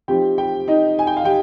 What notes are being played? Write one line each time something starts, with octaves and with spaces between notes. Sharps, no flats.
F3 C4 D#4 G4 G5
G4 G5
D#4 D#5
G#5
G5
F5
G4 G5